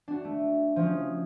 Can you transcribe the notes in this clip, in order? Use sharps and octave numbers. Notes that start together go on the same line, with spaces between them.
D4 F#4
A3
F3 C#4 D#4